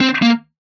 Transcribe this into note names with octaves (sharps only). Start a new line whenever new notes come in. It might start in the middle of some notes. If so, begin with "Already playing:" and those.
C4
A#3